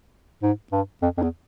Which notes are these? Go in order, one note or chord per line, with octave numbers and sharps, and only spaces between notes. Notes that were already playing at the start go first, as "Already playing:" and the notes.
G#2
G2
F2
F2
E2